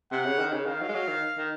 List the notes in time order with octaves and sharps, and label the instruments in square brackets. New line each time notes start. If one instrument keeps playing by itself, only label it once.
[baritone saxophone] C3 [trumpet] F#5
[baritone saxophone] C#3
D#3
C#3
[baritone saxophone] D#3 [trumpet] F5
[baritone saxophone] F#3
G#3
F#3
D#3
D#3